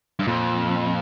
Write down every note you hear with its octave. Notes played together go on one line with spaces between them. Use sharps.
G2
F2 A#2